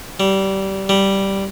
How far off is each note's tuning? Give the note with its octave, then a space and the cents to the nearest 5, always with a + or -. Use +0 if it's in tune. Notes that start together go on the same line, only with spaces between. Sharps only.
G3 -20
G3 -5